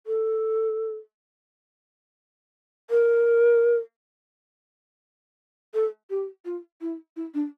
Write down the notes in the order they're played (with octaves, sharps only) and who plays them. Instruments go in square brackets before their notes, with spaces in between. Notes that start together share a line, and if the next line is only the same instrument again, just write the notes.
[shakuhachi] A4
A#4
A4
G4
F4
E4
E4
D4